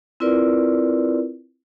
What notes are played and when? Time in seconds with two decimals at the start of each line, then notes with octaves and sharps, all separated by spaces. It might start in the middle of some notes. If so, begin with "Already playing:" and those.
0.20 C4 E4 F4 A#4 B4 D5